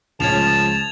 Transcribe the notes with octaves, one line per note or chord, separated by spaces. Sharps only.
C#2 F3 C#4 A5 G#6 A6 F7